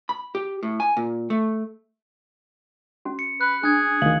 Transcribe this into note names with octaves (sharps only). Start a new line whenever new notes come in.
B5
G4
A2
G#5
A#2
A3
C#4 F#4
C#7
B4 F#6
D4 G#4 F#6 G#6
D2 D#3 F5 F#7